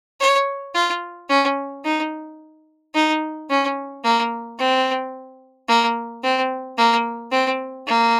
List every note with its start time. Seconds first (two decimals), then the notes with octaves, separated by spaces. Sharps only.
0.20 C#5
0.75 F4
1.29 C#4
1.84 D#4
2.94 D#4
3.49 C#4
4.04 A#3
4.59 C4
5.68 A#3
6.23 C4
6.78 A#3
7.32 C4
7.87 A#3